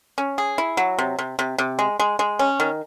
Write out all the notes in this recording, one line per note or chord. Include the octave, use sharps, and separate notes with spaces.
C#4
G#4
E4
F#3
C3
C3
C3
C3
G#3
G#3
G#3
C#4
D#3